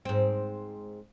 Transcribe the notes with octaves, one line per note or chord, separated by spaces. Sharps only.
G#2 C4